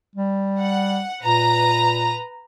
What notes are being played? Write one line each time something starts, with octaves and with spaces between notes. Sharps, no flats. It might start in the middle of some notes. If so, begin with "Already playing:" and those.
G3
F#5
A#2 B4 A#5